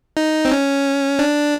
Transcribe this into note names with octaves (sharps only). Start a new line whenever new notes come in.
D#4
C4
C#4
D4